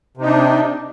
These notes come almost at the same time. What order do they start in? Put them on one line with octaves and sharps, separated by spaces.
C3 D#4 D4